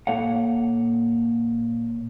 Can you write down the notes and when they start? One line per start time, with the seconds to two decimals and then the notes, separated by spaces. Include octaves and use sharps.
0.07 A#2 A#3 A4 C#5 F5 F#5